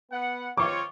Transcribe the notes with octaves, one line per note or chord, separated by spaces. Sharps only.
B3 F#5
C4 F4 C#5 C#6 D6